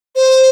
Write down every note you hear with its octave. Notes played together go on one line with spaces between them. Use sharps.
C5